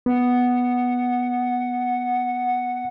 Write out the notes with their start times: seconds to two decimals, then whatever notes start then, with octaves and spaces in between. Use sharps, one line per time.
0.06 B3 F#5